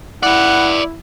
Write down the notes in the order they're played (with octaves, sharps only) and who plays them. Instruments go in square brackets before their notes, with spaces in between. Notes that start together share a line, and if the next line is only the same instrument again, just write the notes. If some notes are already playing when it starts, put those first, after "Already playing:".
[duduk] E4 [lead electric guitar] B4 D5 [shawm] F#5